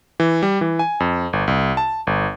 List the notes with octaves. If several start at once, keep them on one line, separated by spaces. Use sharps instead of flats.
E3
G3
E3
G#5
F2
G1
C2
A5
G1